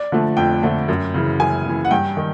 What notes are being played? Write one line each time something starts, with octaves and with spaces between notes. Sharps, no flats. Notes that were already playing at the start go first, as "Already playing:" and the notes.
Already playing: D5
D3 F3 A3
F2 G5
D3 F3 A3
F#2
C#3 E3
F#2 G#5
C#3 E3
F#5
G2 G5
D#3